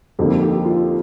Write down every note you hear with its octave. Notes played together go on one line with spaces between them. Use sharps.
F2 D3 G3 A#3 D#4 G4
G4
F4